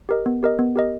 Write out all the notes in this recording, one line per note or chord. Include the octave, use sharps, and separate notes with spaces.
G4 A#4 D#5
B3
G4 A#4 D#5
B3
G4 A#4 D#5